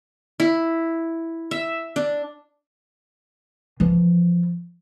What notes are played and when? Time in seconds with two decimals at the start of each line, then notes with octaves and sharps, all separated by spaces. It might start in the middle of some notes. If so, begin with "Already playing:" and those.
0.40 E4
1.51 E5
1.96 D4
3.80 E3 F3